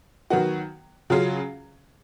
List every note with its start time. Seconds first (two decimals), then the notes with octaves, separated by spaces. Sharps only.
0.30 D#3 F#3 B3 F#4
1.10 C#3 F#3 C#4 F4 G#4